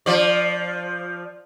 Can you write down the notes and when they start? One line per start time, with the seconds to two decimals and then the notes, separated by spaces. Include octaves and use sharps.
0.06 F3 D5